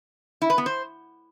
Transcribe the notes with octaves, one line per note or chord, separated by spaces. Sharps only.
E4
B4
B3
C5